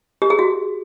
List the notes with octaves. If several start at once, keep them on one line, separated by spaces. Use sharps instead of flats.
G4
G#4
F#4